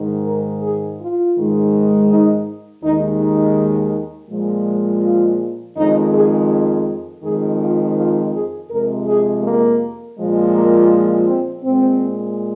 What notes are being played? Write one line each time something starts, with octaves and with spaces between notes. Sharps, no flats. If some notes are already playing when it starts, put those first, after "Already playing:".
Already playing: G#2 D#3 G#3
A#4
G#4
F4
G#2 D#3 G#3
D#4
D#2 D#3 G#3 D#4
D#4
A#2 F3 G#3
F4
F2 D#3 G#3 D#4
G#4
F2 D#3 G#3 G#4
F4
F4
G#4
F2 C3 G#3 A#4
G#4
A#3
A#2 F3 G#3
A#3
C4
A#2 G#3 C4